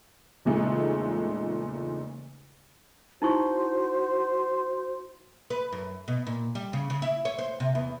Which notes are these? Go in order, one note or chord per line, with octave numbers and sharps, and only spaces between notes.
E2 A#2 C#3 G#3 A3 D#4
D#4 E4 F#4 C5 C#6
B4
F#2
B2
A#2
G3
C#3
C#3
E4
C#5
C5
C3
E2